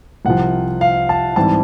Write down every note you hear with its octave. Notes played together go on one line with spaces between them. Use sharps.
C2 C3 F3 F#5
F5
A5
G#2 E3 G3 C4 A5